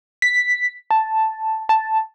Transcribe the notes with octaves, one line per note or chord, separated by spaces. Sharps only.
B6
A5
A5